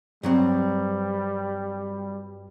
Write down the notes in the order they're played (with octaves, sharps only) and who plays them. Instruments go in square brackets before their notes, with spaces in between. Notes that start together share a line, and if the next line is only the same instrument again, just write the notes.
[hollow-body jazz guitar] G2 F#3 C4 [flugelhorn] G3